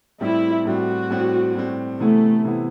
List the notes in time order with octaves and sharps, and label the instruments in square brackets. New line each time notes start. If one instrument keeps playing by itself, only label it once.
[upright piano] A2 G3 C4 [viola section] E4
[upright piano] A2 G3 C4 [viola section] F#4
[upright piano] A2 G3 C4
A2 G3 C4
[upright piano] C3 E3 B3 E4 [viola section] A3
[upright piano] C3 E3 B3 E4